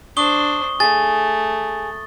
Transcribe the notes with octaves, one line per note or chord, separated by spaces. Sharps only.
D4 C5 C#6 D#6 G7
A3 G#4 A6